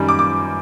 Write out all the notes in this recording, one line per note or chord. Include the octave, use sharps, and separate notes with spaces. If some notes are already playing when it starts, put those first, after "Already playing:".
Already playing: F#2 D#3 G3
D6
D6